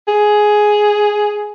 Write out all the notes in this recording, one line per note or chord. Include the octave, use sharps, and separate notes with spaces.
G#4